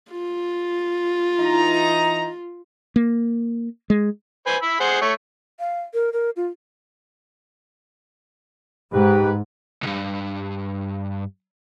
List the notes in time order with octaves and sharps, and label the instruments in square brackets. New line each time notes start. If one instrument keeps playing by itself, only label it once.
[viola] F4
[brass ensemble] E3 D#4 A#5
[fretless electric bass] A#3
G#3
[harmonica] B4 C5 G#5
B5 E6
G#4 C5 F#5
A3 C#5
[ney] F5
A#4
A#4
F4
[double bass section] G#2 [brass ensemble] G4 B4
[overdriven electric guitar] C2 G2